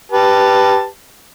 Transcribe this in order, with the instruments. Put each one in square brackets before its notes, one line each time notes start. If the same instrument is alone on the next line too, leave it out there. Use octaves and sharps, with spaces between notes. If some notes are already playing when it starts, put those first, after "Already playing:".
[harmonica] G4 B4 A5